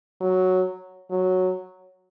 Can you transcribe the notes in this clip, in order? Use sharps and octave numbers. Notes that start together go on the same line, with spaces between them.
F#3
F#3